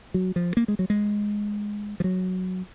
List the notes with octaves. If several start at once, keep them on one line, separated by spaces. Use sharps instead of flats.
F#3
F3
A#3
G#3
F#3
G#3
F3
F#3